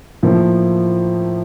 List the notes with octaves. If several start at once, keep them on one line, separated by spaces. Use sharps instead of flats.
A2 F3 A#3